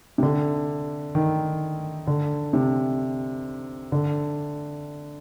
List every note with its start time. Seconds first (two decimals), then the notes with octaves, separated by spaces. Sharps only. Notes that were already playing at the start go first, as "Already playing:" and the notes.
0.18 C3
0.23 D3
1.15 D#3
2.07 D3
2.53 C3
3.92 D3